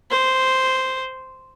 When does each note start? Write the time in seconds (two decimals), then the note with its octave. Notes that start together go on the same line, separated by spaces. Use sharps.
0.11 C5